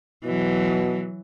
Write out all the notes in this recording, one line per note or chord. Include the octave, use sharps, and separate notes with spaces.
B2 E3 F#3